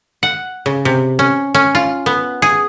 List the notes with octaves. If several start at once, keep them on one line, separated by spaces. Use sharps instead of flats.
F#5
C#3
C3
C#4
C#4
F4
B3
G#4